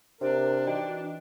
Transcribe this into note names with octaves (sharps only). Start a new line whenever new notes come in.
C3 D4 A#4
E3 D#4 F#4 D5 G5